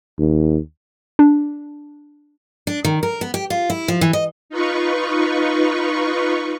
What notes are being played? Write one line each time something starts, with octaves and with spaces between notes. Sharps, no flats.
D#2
D4
D4
D#3
A#4
B3
G4
F4
E4
F3
E3
D#5
D#4 F4 B4 C#6